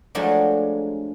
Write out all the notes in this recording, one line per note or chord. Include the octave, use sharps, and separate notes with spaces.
F3 F#3 G#3 A3 D4